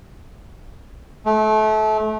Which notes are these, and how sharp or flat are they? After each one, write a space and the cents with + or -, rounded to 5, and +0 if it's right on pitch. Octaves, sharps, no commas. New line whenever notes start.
A3 -30